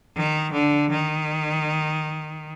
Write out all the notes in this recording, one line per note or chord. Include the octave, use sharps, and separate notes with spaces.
D#3
D3
D#3